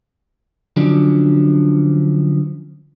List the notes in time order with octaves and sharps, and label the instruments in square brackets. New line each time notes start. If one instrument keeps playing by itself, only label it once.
[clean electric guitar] D3 F3 F#3 C#4 D4